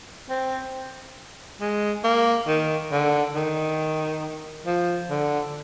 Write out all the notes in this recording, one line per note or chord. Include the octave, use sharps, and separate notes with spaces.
C4
G#3
A#3
D#3
D3
D#3
F3
D3